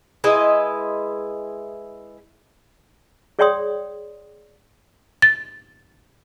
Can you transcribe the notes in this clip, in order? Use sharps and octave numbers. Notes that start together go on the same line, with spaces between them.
G#3 E4 B4 D#5
G#4 C#5 D5 G5 C6 D#6
A6